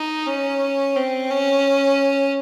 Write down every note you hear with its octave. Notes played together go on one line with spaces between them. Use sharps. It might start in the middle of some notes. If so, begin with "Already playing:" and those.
Already playing: D#4
C#4
C4
C#4